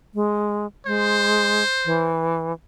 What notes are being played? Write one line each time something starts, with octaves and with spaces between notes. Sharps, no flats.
G#3
G#3 C5
E3